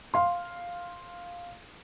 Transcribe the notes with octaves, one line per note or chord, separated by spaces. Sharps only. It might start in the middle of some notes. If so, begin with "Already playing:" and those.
F5 C6